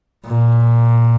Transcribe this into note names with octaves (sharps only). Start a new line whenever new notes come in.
A#2